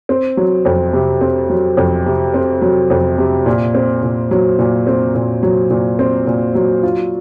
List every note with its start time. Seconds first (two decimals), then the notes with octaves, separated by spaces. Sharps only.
0.09 C4
0.37 F#3
0.65 F2
0.93 C3
1.21 C4
1.50 F#3
1.77 F2
2.06 C3
2.34 C4
2.62 F#3
2.90 F2
3.18 C3
3.46 A#2
3.75 C4
4.03 A#2
4.31 F#3
4.59 A#2
4.87 C4
5.15 A#2
5.43 F#3
5.70 A#2
5.99 C4
6.27 A#2
6.55 F#3
6.83 F4